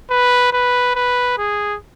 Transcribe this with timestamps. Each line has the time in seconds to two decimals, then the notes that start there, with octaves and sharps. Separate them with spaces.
0.10 B4
0.53 B4
0.96 B4
1.38 G#4